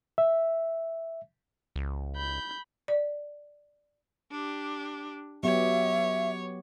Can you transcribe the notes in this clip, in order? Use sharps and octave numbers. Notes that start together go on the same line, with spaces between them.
E5
C#2
B5 G6
D5
D4 G4
F#3 B3 G4 C#5 E5